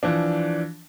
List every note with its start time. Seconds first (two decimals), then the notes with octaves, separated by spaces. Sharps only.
0.03 E3 F3 D4